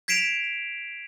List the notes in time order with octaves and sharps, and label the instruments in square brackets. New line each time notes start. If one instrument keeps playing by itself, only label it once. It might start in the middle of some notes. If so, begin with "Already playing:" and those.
[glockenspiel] G#6 B6 C7 D7 E7 F7